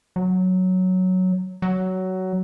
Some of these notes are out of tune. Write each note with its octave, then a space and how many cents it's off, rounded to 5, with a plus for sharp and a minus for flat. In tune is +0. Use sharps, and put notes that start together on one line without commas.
F#3 +0
F#3 +15